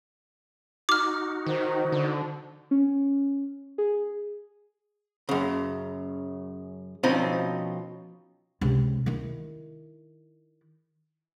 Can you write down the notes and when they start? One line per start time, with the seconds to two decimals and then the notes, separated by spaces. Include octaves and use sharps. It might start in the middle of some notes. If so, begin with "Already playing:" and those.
0.89 D#4 F#4 D6 F6
1.46 D#3 C5
1.92 D3
2.71 C#4
3.78 G#4
5.29 F#2 C#3
7.03 B2 F3 C4 C#4 D#4
8.61 C#2 C3
9.06 D#3 E4